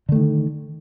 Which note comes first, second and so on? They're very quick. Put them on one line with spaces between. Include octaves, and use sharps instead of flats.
D3 A3 D#3